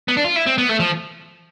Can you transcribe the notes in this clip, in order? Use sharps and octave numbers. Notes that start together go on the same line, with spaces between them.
B3
D4
F4
E4
C4
B3
A3
F3